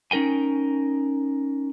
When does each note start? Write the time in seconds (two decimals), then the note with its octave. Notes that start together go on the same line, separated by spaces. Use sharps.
0.11 C#4 D#4 A#4 G5 G#5